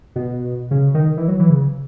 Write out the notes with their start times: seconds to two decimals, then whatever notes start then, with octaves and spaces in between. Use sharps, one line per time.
0.16 B2
0.71 C#3
0.94 D#3
1.17 E3
1.28 F#3
1.39 E3
1.50 C#3